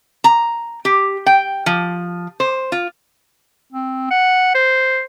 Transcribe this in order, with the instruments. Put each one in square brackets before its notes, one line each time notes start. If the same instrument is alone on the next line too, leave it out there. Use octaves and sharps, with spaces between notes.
[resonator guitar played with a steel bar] A#5
G4
G5
F3
C5
F4
[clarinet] C4
F#5
C5